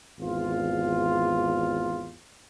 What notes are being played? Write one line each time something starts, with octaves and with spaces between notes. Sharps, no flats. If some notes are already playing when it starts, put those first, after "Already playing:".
G#1 E2 F4